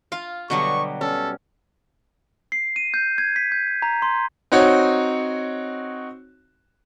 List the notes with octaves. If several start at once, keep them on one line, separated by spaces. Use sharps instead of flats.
F4 F5
B2 D3 F#3 G3 B3 C#6
C#4 A4
C7
D#7
G6
G#6
B6
G6
A#5
C6
C4 D#4 F#4 C#5